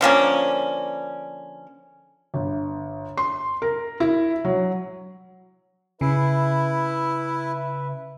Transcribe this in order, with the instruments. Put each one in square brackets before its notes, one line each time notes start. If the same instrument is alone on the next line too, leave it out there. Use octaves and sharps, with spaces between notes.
[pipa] D3 F3 A#3 C#4
[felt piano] G1
C6
A#4
E4
F#3
[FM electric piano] C#3 [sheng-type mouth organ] E4 [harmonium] B4 E5